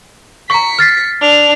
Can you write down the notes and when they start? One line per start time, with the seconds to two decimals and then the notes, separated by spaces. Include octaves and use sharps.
0.50 A#5 C#6 B6 C#7
0.79 F6 A6 C7
1.21 D4 F7